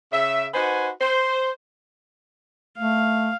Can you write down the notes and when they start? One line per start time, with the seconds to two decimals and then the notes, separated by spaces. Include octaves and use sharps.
0.12 C#3 E5
0.54 D#4 F#4 B4 C5 F#5 G#5
1.01 C5
2.78 A3 F5